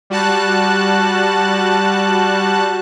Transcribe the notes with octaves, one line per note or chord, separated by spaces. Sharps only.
G3 F#4 A5 F#6